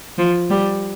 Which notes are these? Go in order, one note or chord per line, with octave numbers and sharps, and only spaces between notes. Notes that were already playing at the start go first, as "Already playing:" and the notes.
F3
G3